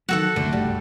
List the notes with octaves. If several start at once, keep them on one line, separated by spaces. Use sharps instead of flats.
D#3 F#3 G3 F#4 A4 F#5
C2 F2 D3 A3
F#1 C2 G2 G3